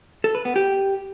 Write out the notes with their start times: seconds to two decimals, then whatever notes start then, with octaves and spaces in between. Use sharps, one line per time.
0.24 A4
0.35 B4
0.45 B3
0.56 G4